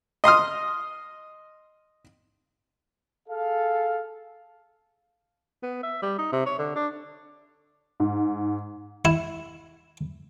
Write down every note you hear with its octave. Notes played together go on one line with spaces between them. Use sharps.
D#5 C6 D#6 F6
G#4 A4 F5
B3
E5
G3
D#4
C3
C#5
D3
D4
G#2
E4